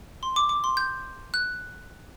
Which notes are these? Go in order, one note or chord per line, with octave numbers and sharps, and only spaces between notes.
C6
D6
D6
C6
G6
F#6